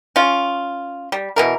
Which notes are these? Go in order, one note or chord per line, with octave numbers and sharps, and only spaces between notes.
C#4 F4
G3
B2 E3 A#4